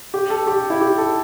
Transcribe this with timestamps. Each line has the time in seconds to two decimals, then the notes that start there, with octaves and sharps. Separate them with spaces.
0.14 G4
0.30 A4
0.47 G4
0.70 E4
0.81 G4
0.98 A4